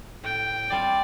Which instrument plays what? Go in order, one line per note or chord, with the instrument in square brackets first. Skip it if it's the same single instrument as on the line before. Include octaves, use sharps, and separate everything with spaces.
[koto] A2 [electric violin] G5
[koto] G3 C4 F4 [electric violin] D5